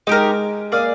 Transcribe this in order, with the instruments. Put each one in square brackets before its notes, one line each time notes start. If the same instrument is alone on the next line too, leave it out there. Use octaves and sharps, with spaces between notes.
[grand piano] G#3 [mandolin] D#4 G4 A#4
[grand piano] A#3 [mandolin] G#4 D5 F5